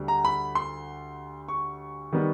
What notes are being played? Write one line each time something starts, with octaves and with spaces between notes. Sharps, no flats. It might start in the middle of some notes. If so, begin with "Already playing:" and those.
Already playing: D2 D3 G3
A#5
B5
C6
C#6
D#3 G3 B3